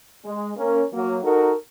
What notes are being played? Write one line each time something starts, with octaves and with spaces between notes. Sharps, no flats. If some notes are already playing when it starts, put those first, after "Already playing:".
G#3
A#3 C#4 A#4
F#3 A#3
D#4 F#4 A4 A#4